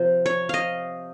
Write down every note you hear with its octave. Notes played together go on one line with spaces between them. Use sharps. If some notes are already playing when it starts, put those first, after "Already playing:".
Already playing: C3 F3 C5
C#5
D#5 F5